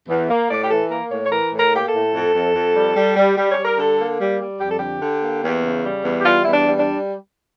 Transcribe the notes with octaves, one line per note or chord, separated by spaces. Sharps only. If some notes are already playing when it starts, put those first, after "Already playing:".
E2
A#3
A2 D5
G4
E3 A4
A#3 A#4
A2 C#5
C#5
E3 A#4
A2
A#4
A#3 G4
A4
A2
F2
F2
F2
G3
G3
G3
G3
C#5
G3
A#4
D3 A4
A#3
G3
G3
F2 G4
A4
D3 G4
D3
A#3
E2
C#3
G3
E2
G4
G3 F4
E2 E4
D4
G3
D4